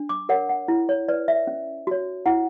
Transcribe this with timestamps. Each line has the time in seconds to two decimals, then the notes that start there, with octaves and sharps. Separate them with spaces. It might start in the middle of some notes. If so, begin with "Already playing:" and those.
Already playing: D4
0.09 D6
0.29 A#4 C#5 F#5
0.49 F#5
0.68 E4
0.89 C#5
1.08 B4 D5
1.28 E5
1.47 C#4
1.87 F#4 C#5
2.26 E4 F#5